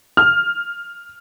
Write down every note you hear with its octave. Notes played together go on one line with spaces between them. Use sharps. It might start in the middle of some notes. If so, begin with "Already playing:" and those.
F6